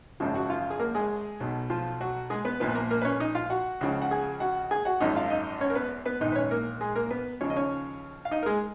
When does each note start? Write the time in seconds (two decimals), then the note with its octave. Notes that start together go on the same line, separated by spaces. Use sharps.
0.20 G#1 F#2 C#3 F3
0.34 F#4 F#5
0.50 F4 F5
0.70 G#4
0.80 A#3 A#4
0.95 G#3 G#4
1.40 B1 B2
1.70 F3 F4
2.01 F#3 F#4
2.30 G#3 G#4
2.45 B3 B4
2.60 A#1 A#2 F3 B3 B4
2.75 A#3 A#4
2.91 A#3 A#4
3.02 B4
3.05 C#4 C#5
3.20 D#4 D#5
3.35 F4 F5
3.50 F#4 F#5
3.81 C#2 C#3 F3
4.02 F#5
4.11 G#4 G#5
4.40 F#4 F#5
4.71 G#4 G#5
4.85 F#4 F#5
5.00 G#1 F#2 F3 D#4 D#5
5.16 F4 F5
5.30 D#4 D#5
5.61 C#4 C#5
5.70 A#4
5.75 B3 B4
6.05 B3 B4
6.20 A#1 G#2 D#3 D#4 D#5
6.32 B4
6.36 C#4 C#5
6.51 A#3 A#4
6.81 G#3 G#4
6.96 A#3 A#4
7.06 A#4
7.11 B3 B4
7.41 D#2 C#3 F3 C#4 C#5
7.50 D#5
7.56 C#4 C#5
8.25 F5
8.31 D#4 D#5
8.43 A#4
8.46 G#3 G#4